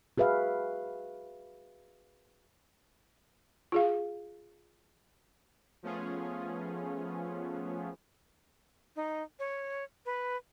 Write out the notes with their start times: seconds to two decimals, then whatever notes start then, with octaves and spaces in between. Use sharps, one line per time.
0.18 F#4 G#4 B4 E5 F5
3.72 F4 G#4 F5
5.83 F3 A3 B3 C#4 F4 G#4
8.96 D#4
9.39 C#5
10.06 B4